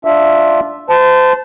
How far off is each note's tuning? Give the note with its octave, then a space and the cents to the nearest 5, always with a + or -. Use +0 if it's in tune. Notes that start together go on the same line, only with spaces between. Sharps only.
D4 +0 F4 +0 E5 +0
C5 -35 A5 +0